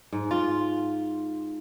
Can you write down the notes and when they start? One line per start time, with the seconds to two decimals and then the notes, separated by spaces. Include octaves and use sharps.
0.12 G#2
0.31 F4